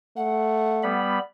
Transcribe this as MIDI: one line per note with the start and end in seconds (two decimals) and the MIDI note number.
0.17 1.00 57
0.17 1.01 78
0.83 1.19 55
0.83 1.19 59
0.83 1.19 83